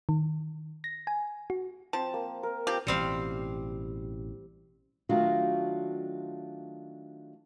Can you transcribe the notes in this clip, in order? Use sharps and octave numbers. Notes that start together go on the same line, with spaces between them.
D#3
A#6
G#5
F#4
F3 C4 A5
A#3
A#4
F3 C4 G4
A1 B2 G3 C4 F5
D#3 F#3 A3 D4 F4 F#4